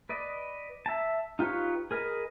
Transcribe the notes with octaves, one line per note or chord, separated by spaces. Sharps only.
B4 D5 D#5
E5 A5
D#4 F4 G4 B4 C#5
G#4 A#4 B4 D#5